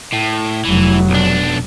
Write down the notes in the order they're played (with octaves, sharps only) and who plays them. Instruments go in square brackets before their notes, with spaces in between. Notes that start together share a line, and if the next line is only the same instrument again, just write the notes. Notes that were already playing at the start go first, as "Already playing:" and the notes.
[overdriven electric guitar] A2
[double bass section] F1 F#3 [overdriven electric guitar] E3
[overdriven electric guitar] B1 D4